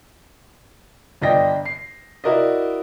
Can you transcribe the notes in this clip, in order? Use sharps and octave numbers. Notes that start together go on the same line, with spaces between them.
G1 D4 D#5 G5 A#6
C7
E4 F#4 A#4 D5 D#5